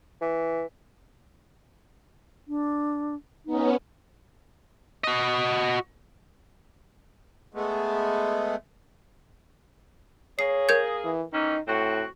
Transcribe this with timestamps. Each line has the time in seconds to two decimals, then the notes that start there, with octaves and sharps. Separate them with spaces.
0.21 E3
2.48 D4
3.46 B3 C#4 D#4
5.04 F#4 D#5
7.54 G#3 A3 B3
10.39 A#3 G#4 C#5 C7
10.69 A#4 G6 G#6
11.04 E3
11.33 D#3 E3 C#4 D#4
11.68 A2 C4 F#4